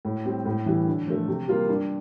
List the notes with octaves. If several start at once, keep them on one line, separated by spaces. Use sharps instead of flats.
A2
G3 C4
A2
E3 G3
D3
F3 A3
C3
G3 A#3 F4
G2